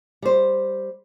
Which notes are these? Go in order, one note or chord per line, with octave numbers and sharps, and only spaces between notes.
G3 C5